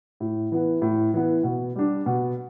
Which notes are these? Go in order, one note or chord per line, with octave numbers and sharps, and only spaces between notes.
A2
E3 B3
A2
E3 B3
B2
G3 D4
B2